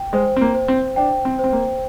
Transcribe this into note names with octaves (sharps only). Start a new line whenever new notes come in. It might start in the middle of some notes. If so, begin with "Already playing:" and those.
Already playing: G5
G#3 C5
C4
A#3
C5
C4
D4 G5
C4
C4 C5
A#3